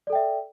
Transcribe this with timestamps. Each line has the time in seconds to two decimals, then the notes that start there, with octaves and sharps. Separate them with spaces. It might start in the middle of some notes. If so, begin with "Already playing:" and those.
0.07 D5
0.10 A4
0.13 G5
0.15 E5